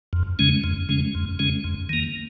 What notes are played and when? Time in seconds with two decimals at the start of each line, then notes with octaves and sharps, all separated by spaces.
0.13 F2
0.39 C#3 G#3 C#4
0.64 F2
0.89 C#3 G#3 C#4
1.15 F2
1.39 C#3 G#3 C#4
1.64 F2
1.89 D#3 A#3